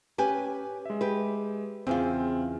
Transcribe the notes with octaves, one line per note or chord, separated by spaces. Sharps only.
C#4 G4 B4 G#5
G#3 E5
G4 B4
E2 C#3 C4 F4